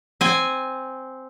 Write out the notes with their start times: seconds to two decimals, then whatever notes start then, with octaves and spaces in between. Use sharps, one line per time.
0.21 C4 G#5